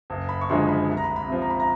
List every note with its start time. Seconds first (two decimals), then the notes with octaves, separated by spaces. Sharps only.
0.10 F#1
0.29 B5
0.41 C#6
0.49 F#2 D3 F3 G#3 C6
0.69 B5
0.89 C2 B5
0.97 A#5
1.04 B5
1.16 B5
1.28 C3 F3
1.42 A#5
1.50 B5
1.60 A#5